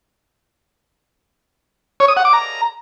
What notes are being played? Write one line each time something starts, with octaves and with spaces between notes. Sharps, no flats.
C#5
D#6
F#5
D6
A#5